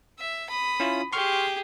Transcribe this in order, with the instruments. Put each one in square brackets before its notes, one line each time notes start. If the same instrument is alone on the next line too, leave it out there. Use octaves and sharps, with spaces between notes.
[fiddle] E5
B5 D#6
[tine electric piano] C#4 E4 F4
[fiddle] G4 G#4 [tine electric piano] C6 C#6 F6